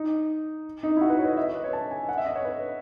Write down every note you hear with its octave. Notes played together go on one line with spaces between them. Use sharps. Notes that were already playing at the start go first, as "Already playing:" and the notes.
Already playing: D#4
D#4
E4
F#4
B4
C#5
D#5
E5
D#5
B4
C#5
A5
G#5
F#5
E5
D#5
C#5
B4